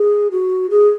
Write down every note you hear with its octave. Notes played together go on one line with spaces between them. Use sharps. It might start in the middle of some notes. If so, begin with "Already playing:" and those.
Already playing: G#4
F#4
G#4